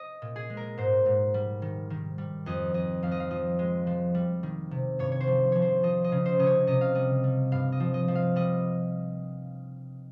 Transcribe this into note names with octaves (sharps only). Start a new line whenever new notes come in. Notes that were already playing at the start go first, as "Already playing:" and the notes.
Already playing: D#5
A#2
G#4
G#3
A#4
G#2 C5
G#2
G3
D#3
D#3
G3
F2 D#5
F2 D#5
F2 F5
D#5
F5
F3 D#5
G#3
F3
G3
D#3
C3
G2 C#5
C#5
C5
F3
F3 C#5
C5
F3 D#5
D#5
C#3
C5
C#3 D#5
C#5
C3 D#5
F5
G3 D#5
G3
G2 F5
D#5
F3
D#5
F3
F5
G3 D#5